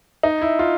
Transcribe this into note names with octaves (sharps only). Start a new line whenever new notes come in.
D#4
E4
F4